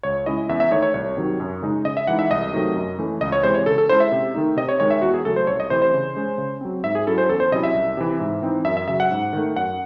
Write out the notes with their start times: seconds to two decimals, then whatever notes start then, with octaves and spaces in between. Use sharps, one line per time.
0.03 C#2 C#5
0.26 C#3 G#3 C#4 E4 D#5
0.49 E2 E5
0.60 E5
0.71 D#3 A3 D#4 C#5
0.82 C#5
0.94 C2 C#5
1.17 C3 D#3 F#3
1.40 F#2
1.62 C#3 G#3 D#4
1.85 C#3 D#5
1.97 E5
2.07 E3 G#3 D#4 F#5
2.19 E5
2.30 C2 D#5
2.53 C3 D#3 F#3 A3
2.76 F#2
2.99 E3 A3 C#4
3.21 C#2 D#5
3.32 C#5
3.43 C3 E3 G#3 C5
3.54 C#5
3.66 C#3 A4
3.78 A4
3.89 G#3 C#4 E4 C5
4.00 E5
4.12 C3
4.34 D#3 A3 D#4
4.57 C3 D#5
4.69 C#5
4.80 D#3 G#3 C#5
4.90 E5
5.02 E2 F#4
5.14 G#4
5.25 C#3 F#3 A3 A4
5.36 C5
5.47 C2 C#5
5.60 D#5
5.70 C3 E3 A3 C5
5.82 C5
5.93 C#3
6.16 G#3 C#4
6.38 C#3
6.61 F#3 C4
6.84 G#2 E5
6.95 G#4
7.07 F#3 C#4 E4 A4
7.18 C5
7.29 E2 A4
7.40 C5
7.52 C3 F#3 C#4 E4 D#5
7.64 E5
7.74 C2
7.97 C3 E3
8.20 G#2
8.42 E3 C4 D#4
8.65 F#2 E5
8.77 E5
8.88 C#3 F#3 E5
9.00 F#5
9.11 G#2
9.33 D#3 A3
9.56 F#2 F#5